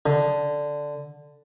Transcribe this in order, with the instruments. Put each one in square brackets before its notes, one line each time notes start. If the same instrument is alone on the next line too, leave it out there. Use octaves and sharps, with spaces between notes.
[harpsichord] D3